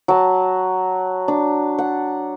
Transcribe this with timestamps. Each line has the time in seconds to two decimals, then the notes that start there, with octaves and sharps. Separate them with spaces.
0.08 F#3 A5
1.28 D4
1.78 F#5